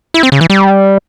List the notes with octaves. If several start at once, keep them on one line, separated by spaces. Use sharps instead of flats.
E4
C4
C#3
E3
G3